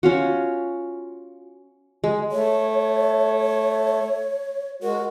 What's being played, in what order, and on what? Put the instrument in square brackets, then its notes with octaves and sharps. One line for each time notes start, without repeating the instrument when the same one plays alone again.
[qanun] C#4 F4 F#4
G#3
[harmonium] A3 [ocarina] C#5
[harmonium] G#3 F#4 [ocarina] A#4